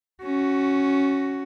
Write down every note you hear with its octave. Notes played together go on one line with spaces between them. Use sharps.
C#4 F#4